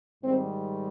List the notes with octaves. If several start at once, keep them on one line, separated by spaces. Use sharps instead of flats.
G#2 D#3 G3 C4